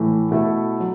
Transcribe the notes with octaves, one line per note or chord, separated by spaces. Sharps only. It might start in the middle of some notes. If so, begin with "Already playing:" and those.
Already playing: A2 E3 A3
B2 A3 E4 A4
F#3